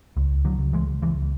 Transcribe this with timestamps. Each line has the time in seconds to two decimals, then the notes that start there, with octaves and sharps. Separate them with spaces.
0.17 C#2
0.45 D3 F#3
0.59 C#2
0.73 E3 G#3
1.02 C#2 E3 G#3